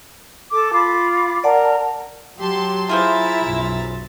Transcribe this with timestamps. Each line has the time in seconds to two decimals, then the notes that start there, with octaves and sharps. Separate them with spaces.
0.51 A4 D6
0.73 F4 B5 D6
1.44 A#4 D5 F#5 A5
2.39 F#3 G4 A5 C6
2.89 E4 F4 G#4 C5 E5 A#5 A6
3.42 B1 F#2